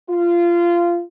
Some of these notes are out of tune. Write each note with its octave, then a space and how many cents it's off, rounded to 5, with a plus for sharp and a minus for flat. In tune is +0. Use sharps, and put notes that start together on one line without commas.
F4 -20